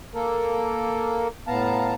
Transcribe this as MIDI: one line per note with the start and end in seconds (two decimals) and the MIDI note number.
0.15 1.27 58
0.15 1.27 69
0.15 1.27 70
1.48 1.94 45
1.48 1.94 59
1.48 1.94 77
1.48 1.94 81
1.48 1.94 82